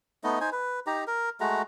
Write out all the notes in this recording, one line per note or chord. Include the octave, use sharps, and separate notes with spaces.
A3 B3 D#4 D#5
D#4 C5 G#5
B4
D#4 G4 A#5
A#4
G#3 A3 F#4 A#5